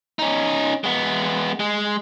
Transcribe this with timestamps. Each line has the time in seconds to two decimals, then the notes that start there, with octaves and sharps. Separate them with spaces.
0.19 C#4 D#4
0.84 G#3 B3
1.60 G#3